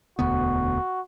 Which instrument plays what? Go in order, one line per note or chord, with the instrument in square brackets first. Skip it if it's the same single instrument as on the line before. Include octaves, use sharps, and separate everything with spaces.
[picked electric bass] E1 D2 B3 [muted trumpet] F#4